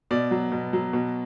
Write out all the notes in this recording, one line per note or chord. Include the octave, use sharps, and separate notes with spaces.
B2 D5
F#3
B2
F#3
B2